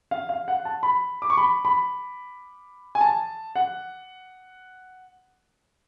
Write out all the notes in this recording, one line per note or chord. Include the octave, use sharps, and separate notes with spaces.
F5
F5
F#5
A5
B5
D6
C#6
B5
B5
G#5
A5
F#5